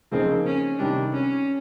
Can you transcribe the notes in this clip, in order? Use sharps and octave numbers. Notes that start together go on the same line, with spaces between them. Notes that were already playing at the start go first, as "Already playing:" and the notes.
C#3 F3 A#3 C4 D#4 G#4
C#4
C3 D#3 G3 D4
C#4